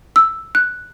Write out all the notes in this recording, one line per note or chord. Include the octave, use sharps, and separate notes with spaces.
E6
F#6